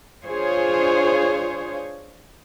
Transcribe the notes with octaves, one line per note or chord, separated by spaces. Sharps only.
D4 F4 G#4 C5 C#5